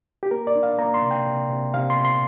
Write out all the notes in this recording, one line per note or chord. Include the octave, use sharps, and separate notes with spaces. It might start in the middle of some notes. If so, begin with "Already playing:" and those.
G4
A#3 A#4
D5
D4
F5
A#3 A#5
C6
C3
G5
C3
C3
C3 F5
C6
C3
C6